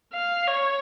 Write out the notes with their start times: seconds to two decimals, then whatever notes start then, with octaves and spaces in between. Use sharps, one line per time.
0.14 F5
0.47 C#5